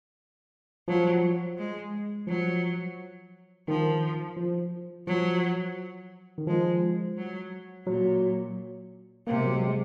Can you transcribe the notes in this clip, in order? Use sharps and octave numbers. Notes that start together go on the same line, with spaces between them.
F3 F#3
G#3
F3 F#3
D#3 F3
F3
F3 F#3
D#3
F3 G#3
F#3
A#2 F#3
C3 A#3
G#3
F#3
G#3